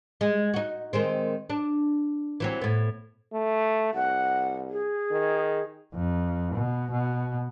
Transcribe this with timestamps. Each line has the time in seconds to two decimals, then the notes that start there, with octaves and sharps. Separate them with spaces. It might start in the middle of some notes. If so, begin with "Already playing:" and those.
0.21 G#3
0.54 D#4 F#4
0.93 D#3 G#3 C4
1.50 D4
2.40 E3 F#3 C4
2.62 A2 B3
3.33 A3
3.94 C2 F#5
4.70 G#4
5.11 D#3
5.94 F2
6.55 B2
6.91 B2